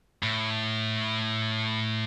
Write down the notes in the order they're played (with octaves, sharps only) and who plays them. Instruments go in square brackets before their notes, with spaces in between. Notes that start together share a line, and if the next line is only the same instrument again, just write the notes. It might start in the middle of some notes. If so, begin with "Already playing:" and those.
[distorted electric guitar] A2